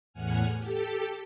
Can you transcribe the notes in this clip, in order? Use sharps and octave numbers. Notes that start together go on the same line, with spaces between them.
E2 A2 F#5 G#5 F6
G4 A4